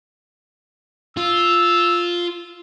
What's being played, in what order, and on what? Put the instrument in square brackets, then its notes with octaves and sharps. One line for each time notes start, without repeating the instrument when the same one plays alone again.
[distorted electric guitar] F4 [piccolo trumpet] E6